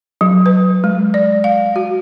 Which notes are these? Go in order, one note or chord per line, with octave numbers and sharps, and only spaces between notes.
F#3
B4
G#3
D5
F5
F#4